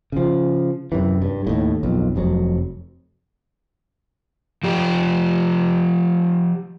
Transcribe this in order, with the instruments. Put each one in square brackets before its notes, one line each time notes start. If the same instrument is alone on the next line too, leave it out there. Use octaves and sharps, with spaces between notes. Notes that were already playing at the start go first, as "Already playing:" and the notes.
[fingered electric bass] C#3 F3
F#2 C3 E3
G2
D#2 A2
B1 F2
F1 F2 F#3
[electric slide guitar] F3 G4